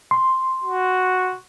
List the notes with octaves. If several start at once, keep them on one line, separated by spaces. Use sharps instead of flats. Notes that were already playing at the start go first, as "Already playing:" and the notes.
C6
F#4